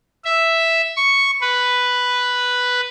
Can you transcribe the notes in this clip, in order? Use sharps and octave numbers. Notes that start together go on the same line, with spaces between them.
E5
C#6
B4